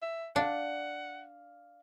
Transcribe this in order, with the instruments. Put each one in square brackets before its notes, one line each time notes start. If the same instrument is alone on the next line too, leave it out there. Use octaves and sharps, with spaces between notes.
[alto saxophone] E5
[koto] D4 [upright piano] D5 F5 [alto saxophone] F#5